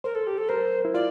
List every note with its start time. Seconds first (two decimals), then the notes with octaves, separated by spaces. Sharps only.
0.04 A#4 C5
0.15 A4
0.27 G4
0.38 A4
0.49 A#4 C5
0.85 E4
0.94 F4 D5